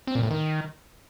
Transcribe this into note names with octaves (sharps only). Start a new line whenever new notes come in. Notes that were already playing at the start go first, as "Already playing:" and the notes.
C4
A#2
A2
D#3